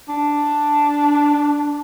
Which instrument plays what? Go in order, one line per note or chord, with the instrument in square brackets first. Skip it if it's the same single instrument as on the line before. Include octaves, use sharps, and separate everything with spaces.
[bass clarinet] D4